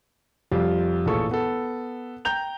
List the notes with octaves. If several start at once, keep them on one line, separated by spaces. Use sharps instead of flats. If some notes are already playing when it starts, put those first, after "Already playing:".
F2 G3 F4 G4
A1 A#2 F4 G#4 A4 C#6
B3 A4
G5 A#5 G6 F7